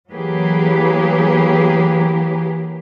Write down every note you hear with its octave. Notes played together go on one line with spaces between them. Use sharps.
E3 F#3 A#3 G4 G#4 B4